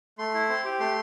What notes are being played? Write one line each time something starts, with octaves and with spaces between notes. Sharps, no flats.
A3 C6
E4
C4
G4
A3 C6